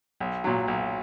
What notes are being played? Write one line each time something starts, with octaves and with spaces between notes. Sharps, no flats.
B1
A#2 F#3
B1